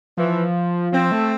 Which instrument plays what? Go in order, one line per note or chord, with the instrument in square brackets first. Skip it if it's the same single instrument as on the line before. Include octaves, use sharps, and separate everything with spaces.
[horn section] E3 [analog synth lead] F3
[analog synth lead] F3 [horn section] C4
[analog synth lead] A3